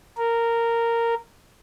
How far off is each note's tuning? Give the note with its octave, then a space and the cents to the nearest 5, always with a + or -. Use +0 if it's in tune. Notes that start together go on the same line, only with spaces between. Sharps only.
A#4 -10